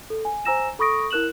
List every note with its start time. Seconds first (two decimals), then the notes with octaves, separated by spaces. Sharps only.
0.10 A4
0.25 G#5
0.45 C5 G#5 A#5 E6 A#6 E7
0.79 A4 B5 C#6 D#6 A#6 D7
1.10 E4 A#4 F#6 E7 F#7